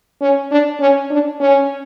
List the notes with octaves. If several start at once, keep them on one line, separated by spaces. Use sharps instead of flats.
C#4
D4
C#4
D4
C#4